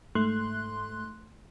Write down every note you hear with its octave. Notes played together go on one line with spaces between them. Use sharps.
G#2 A3 C6 F#6